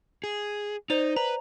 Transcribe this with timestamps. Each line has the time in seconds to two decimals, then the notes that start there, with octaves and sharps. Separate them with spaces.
0.24 G#4
0.90 D#4 C5 D5 F7
1.16 B4 A#5